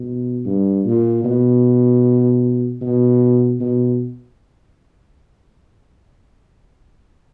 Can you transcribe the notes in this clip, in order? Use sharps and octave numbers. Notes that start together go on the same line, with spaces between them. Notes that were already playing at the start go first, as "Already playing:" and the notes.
Already playing: B2
G2
A#2
B2
B2
B2